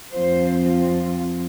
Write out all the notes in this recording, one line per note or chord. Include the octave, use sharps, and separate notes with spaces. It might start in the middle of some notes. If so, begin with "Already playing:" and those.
F2 F3 C4 F4 C5